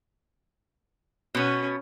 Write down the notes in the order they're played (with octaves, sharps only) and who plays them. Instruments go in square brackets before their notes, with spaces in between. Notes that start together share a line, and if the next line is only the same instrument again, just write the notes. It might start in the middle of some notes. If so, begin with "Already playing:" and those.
[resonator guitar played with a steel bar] B2 B3 [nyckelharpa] C#4